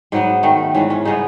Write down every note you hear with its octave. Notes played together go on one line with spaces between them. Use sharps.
G#2 F#3 B3 D#4
D#3 A3
G#2 E3 G#3 C#4
C#4
C#3 G#3 B3 D#4